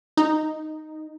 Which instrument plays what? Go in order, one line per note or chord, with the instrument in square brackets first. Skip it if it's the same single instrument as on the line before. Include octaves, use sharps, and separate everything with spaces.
[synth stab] D#4